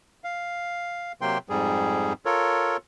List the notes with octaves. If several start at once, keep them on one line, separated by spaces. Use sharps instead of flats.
F5
C3 F#3 A#3 G5 C6
F2 G#2 G3 G#4
F4 A4 A#4 C#5